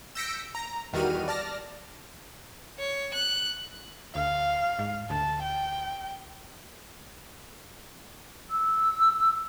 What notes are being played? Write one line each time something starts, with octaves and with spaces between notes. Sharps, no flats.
E6 G6 A#6 B6 C#7 D7
A#5
E2 D#3 G3 F#4 F6 D#7
D5 A5 F6 A#6
C#5
F#6
D2 F5
G#2
D2 A5
G5
E6